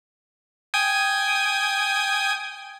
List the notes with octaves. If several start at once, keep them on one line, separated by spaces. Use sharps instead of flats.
G5 G#5 D#6